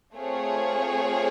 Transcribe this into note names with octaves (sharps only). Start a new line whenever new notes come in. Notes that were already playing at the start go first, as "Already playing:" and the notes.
A3 C4 F4 G#4 C#5